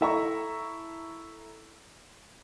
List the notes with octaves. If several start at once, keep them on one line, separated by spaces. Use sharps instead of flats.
E4 A4 E5 A#5 B5 C#6